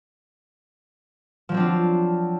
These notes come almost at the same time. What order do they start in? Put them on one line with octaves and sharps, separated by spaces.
F3 F#3 C4 D4 F4